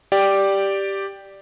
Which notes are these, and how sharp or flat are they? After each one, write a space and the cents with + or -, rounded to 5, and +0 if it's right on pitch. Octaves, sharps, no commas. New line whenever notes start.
G4 +0 D5 +0